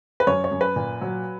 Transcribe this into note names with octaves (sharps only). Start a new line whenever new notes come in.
B4
F#2 C#5
C#5
F#2
B4
A#2
F#3